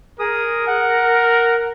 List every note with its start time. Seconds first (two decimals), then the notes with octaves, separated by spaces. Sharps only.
0.19 G#4 A#4 D#6
0.67 F#5